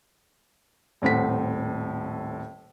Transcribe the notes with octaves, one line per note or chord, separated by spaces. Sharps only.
D#1 A2 C4 F#5 B6